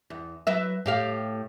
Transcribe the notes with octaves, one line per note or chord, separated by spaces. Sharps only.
E2
F#3 B4 E5
A2 G4 F5